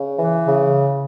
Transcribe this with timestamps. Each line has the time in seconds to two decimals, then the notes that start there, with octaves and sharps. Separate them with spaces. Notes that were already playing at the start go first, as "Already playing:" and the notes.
Already playing: C#3
0.18 E3
0.46 C#3